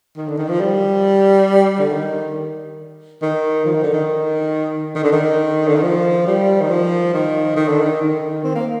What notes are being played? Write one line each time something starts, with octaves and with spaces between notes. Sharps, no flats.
D#3
D3
D#3
F3
G3
D3
D#3
D#3
F3
D#3
D3
D#3
D#3
D3
D#3
D3
D#3
F3
G3
D#3
F3
D#3
D#3
D3
D#3
D#3
C4
A#3